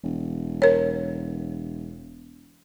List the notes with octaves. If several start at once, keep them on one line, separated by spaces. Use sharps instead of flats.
E1
A#4 C#5